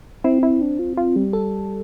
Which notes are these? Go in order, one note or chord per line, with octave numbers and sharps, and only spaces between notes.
C4 E4
E4
D4
F4
F4
G3
A4